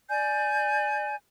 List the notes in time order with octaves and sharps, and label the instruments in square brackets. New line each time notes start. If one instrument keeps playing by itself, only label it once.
[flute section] D5 G#5 G6